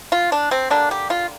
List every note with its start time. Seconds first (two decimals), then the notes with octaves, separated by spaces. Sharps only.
0.12 F4
0.32 D4
0.51 C4
0.70 D3 G3 A#3 D4
0.91 G4
1.10 F4